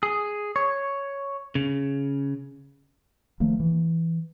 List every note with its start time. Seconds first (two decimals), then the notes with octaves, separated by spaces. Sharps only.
0.03 G#4
0.56 C#5
1.55 C#3
3.40 D#3 F3 A3 A#3
3.60 E3